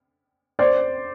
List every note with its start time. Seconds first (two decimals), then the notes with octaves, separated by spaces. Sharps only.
0.59 C5 D5